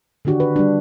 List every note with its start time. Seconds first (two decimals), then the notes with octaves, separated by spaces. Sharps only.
0.25 D3 D#3 D4 F#4 G4
0.40 B4
0.56 G3 D4